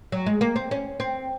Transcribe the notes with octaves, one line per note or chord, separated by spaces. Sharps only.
F#3
G#3
A#3
C4
C#4
C4